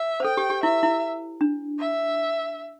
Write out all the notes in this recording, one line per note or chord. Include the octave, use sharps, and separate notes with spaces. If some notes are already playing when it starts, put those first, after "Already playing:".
Already playing: E5
C5
A4 G5
G4
G4
E4 E5
E4
D4
E5